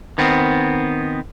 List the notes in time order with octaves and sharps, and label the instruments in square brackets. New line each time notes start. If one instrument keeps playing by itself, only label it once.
[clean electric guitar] D#3 B3 C4